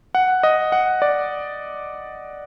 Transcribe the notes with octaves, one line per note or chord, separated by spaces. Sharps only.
F#5
D#5
F#5
D5